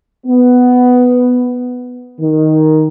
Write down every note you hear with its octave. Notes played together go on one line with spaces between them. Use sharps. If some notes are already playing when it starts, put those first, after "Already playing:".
B3
D#3